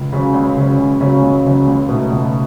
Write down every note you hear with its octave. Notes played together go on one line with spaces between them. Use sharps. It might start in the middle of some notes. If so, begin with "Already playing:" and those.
Already playing: C#2
C#3 F#3 C#4
C#2
C#3 F#3 C#4
C#2
C#3 F#3 C#4
C#2
C#3 F#3 C#4
C#2
B2 A3 D#4
C#2